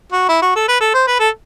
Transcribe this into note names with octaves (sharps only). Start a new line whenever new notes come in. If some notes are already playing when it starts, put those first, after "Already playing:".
F#4
E4
F#4
A4
B4
A4
C5
B4
A4